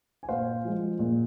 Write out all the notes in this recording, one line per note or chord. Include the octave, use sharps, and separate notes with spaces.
G#5
A#2 C5 F5
F3 G#3
A#2